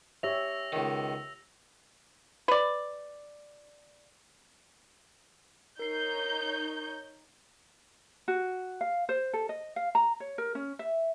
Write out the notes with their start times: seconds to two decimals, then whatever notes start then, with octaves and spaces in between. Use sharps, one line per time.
0.23 G4 C#5 E5 E6 A#6 F7
0.72 C#2 D#3
2.48 B4 D5
5.79 D#4 A#4 C#5 G6 C7
8.28 F#4
8.81 F5
9.09 C5
9.33 A4
9.49 D#5
9.76 F5
9.95 A#5
10.20 C#5
10.38 A#4
10.55 C#4
10.79 E5